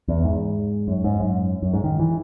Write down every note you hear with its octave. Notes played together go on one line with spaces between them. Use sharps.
E2
G#2
F#2
G#2
F#2
F#2
G#2
D#3
E3